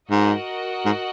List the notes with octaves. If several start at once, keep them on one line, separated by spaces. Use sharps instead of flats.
G#2 F#4 A#4 D#5 F#5
G#2